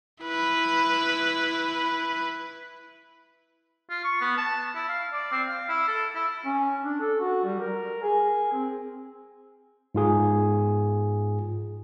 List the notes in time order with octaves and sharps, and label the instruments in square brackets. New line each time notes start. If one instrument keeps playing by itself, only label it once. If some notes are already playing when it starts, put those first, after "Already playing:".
[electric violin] E4 B4
[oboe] F4
C#6
B3
A5
E4
F5
D5
C4
F5
E4
A4
E4
[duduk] C#4
D4
A4
F#4
G3
A#4
G#4
C4
[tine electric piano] G#2 F4 G#4